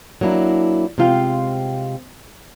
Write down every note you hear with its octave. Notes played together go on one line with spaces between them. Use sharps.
F#3 A#3 D4 E4
C3 G#3 C4 F4 F5 G5